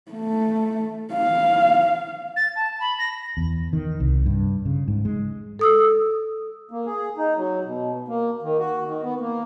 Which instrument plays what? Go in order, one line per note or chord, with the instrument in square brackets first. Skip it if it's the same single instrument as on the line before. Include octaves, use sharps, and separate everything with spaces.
[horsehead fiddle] A3
F5
[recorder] A6
A5
B5
A#6
[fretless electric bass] E2
D#3
C2
G2
C#3
G#2
G#3
[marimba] A4 D#6 E6
[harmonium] A#3
G#4
D#4
F#3
B2
A#3
D#3
F#4
D#3
B3
A#3